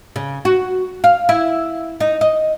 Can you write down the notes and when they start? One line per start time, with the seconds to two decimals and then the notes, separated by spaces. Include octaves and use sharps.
0.16 C#3
0.45 F#4
1.04 F5
1.29 E4
2.00 D#4
2.21 D#5